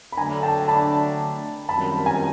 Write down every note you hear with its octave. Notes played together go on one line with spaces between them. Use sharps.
B5
D3 F#3 A3 D4 G#5 A#5
G5 A5
A5 B5
F#2 D#3 G3 C4 F4 A5 B5
G#5 A#5